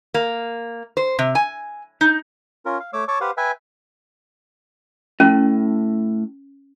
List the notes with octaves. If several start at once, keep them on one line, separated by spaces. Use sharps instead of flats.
A#3
C5
C3
G#5
D#4
C#4 F4 A#4
F5
A3 C#5 D6 E6
C#5 A5 C#6 D6 E6
G4 B4 C5 F5 F#5
B4 E5 G5 G#5
A2 C#4